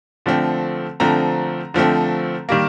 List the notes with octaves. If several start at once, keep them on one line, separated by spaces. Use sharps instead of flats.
D3 F3 A3 C4
D3 F3 A3 C4 A#5
D3 F3 A3 C4
D#3 G3 A#3